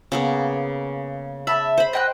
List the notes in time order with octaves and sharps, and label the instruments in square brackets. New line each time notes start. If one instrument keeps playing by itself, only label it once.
[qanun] C#3 A#3 B3
[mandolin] E5 A5 [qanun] B5
[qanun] C5 B5
[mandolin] D#5 G5 F#6